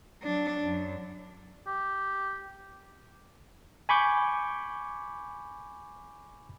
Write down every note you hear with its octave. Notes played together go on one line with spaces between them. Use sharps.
F#3 D4
F#2
G4
G#5 B5 C#6 D6 G6